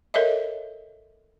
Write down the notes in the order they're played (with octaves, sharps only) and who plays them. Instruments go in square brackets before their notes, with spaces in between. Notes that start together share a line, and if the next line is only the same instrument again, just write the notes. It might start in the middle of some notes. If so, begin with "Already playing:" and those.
[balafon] A4 A#4 C#5 D#5 E5